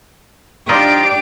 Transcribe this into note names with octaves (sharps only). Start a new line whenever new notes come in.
F3 D4 D#4 F4 G4 D5 D7